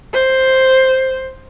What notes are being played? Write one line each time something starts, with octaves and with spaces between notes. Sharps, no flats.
C5